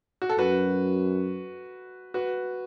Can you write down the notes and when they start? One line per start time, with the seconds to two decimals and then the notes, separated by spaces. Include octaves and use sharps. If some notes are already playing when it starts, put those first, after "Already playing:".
0.22 F#4
0.29 A4
0.38 F#2 F#4 B4
2.14 F#4 B4